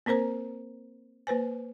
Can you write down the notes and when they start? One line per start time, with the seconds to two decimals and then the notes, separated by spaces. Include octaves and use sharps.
0.06 A#3 C4 A#4 C5 A#5
1.27 A#3 B4 C5 G#5